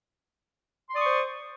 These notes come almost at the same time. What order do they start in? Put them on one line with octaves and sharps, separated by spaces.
C6 D5 D#6 C#6 C5